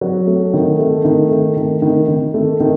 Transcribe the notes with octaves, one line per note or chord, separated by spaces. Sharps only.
F#3
A3
D#3
A3
D#3
A3
D#3
D#3
D#3
A3
D#3